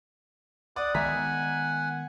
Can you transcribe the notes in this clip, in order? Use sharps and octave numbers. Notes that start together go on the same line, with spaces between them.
D5 F#5 D#6
D#3 G#3 B3 E5 F#5 G#5 A#5 B6